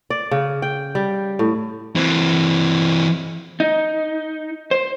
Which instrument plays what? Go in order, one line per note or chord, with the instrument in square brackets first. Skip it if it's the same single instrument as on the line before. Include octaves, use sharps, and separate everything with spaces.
[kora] D5
C#3
G5
G3
A2
[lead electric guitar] E3 C4
[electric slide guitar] D#4
C5